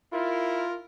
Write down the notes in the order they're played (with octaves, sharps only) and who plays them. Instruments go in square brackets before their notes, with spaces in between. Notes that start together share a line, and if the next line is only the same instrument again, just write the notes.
[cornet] E4 [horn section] F4 A#4